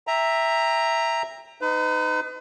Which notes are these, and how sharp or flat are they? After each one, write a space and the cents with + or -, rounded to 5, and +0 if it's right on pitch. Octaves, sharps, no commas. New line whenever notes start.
E5 +0 G5 +30 A#5 +0
D#4 -5 B4 +40